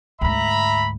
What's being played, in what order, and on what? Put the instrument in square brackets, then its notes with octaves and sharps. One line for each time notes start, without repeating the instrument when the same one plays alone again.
[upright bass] D2 G#2 [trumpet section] E5 A#5 B5